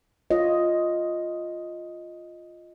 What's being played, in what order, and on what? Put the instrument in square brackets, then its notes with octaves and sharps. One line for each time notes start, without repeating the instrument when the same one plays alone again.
[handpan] F4 C#5 D#5